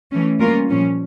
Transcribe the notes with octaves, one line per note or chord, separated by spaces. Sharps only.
E3 A3 C#4
G3 A#3 C#4 F4 A#4
A#2 F3 C#4